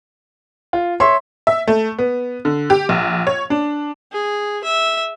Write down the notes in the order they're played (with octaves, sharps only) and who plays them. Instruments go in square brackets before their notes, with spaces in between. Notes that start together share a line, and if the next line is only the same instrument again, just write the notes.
[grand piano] F4
[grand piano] C#5 E5 [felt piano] C6
[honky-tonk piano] E5
A3
B3
D3
G4
A#1
C#5
D4
[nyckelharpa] G#4
E5